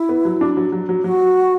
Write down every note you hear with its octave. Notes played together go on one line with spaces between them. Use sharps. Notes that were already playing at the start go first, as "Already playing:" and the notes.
Already playing: E4
B3
F#3
D4
F#3
F#3
F#3
F#3 F#4